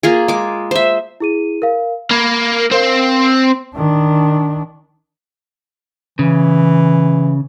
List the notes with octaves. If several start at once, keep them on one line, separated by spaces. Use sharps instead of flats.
A#3 F4 G#4
G#3 D6
C5 E5
E4 G#4 D#7
A#4 F5
A#3 B5 G#6
C4 A#4 F5
D#3 D4
C#3 E3